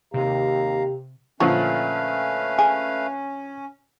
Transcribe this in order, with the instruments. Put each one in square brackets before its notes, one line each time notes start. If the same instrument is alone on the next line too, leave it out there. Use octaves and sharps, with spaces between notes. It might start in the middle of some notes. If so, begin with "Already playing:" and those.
[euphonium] D#2 [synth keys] C3 [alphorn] G4 [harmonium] F5 A#5
[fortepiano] A#2 D3 F3 [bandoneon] A3 B4 F5 [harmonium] C#4 [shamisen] C#5
[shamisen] G#4